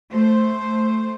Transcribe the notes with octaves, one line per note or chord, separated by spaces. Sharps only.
A3 C5